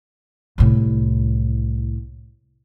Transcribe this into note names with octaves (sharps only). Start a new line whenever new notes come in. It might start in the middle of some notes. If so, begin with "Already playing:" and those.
C2 A2